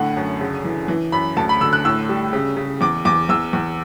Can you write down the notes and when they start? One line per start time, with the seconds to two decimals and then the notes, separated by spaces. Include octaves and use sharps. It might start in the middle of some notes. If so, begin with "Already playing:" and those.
Already playing: A2 D3 F#5
0.17 F#2
0.41 C#3
0.64 E3
0.88 E3
1.12 F#2 B5
1.37 D2 A5
1.49 B5
1.61 D3 E6
1.73 F#6
1.85 A2 E6
2.09 G3
2.33 C#3
2.57 C#3
2.81 E2 D6
3.05 E2 D6
3.29 E2 E6
3.53 E2